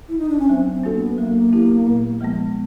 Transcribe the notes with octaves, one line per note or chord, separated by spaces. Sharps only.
E4
D#4
D4
C#4
F#3 C4
C4
A#3 D4 F#4 A4
B3
F#3 A#3
B3 E4 G4
A#2
F3 G#3 B3